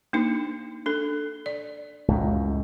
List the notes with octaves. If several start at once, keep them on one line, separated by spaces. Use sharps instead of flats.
A#3 D4 D#4
D4 A4
D5
C#2 F#2 A2